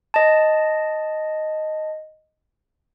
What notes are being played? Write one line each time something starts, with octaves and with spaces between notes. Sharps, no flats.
D#5 A5